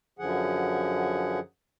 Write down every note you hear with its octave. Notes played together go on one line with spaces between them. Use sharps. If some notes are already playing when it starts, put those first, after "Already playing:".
F#2 D3 F3 G#4 F#5